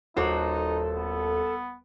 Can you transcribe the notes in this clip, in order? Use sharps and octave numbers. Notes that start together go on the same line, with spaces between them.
D#1 D#4 F#4 A4 C5 C#5 D6
B3